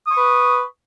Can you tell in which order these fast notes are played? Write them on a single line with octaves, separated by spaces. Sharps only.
D#6 C#6 B4